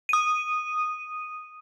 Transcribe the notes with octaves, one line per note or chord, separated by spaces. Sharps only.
D#6 D#7